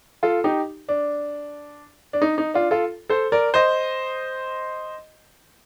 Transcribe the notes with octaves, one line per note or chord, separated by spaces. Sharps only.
F4 A4
D#4 G4
D4
D4
D#4
D#4
D4 F4
F4 A4
A4 C5
A#4 D5
C5 D#5